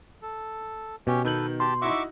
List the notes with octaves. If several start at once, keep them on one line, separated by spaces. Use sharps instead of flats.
A4
B2 C#4 G4
D#3 A4 B4 G6 F#7
G4 A5 C6
D#4 E4 F#4 E5 C#6 D6